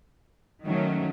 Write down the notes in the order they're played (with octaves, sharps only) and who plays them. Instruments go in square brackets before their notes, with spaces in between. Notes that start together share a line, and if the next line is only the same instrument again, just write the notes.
[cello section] D#3 F#3 A3 C#4